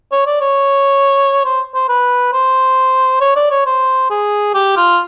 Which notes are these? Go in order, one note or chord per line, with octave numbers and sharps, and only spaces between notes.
C#5
D5
C#5
C5
C5
B4
C5
C#5
D5
C#5
C5
G#4
G4
F4